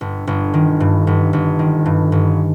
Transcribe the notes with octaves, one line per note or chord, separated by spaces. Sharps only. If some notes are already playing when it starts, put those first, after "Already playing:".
G1
G1
D#3
G2
G1
G1
D#3
G2
G1